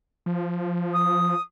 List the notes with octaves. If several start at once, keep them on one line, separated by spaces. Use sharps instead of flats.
F3
D#6